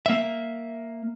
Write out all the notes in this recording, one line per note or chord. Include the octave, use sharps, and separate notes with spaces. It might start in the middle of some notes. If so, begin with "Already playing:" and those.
A#3 E5